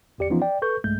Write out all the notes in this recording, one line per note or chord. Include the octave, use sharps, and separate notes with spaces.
G1 E2 G4 D5 C#7
E3 F3 B3 C#4 D#4 F4
D5 G5
A4 B4 C#6 G6
B1 G2 G#3 A3 G6